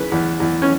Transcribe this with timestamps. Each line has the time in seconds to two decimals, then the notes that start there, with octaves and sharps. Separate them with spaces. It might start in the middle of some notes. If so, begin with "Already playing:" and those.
Already playing: C#3 E3 B4
0.12 E2
0.40 E2
0.62 C#4